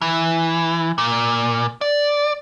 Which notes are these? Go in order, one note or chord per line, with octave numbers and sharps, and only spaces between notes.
E3
A#2
D5